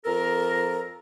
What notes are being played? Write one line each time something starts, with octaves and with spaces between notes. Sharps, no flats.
F2 A4 A#4